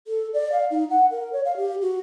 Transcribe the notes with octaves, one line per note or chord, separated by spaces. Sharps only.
A4
D5
F5
D#4
F#5
A#4
C#5
F5
G4
F#4